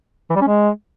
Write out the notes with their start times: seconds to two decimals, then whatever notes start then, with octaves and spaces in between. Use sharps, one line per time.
0.30 E3
0.36 G3
0.42 C#4
0.47 G#3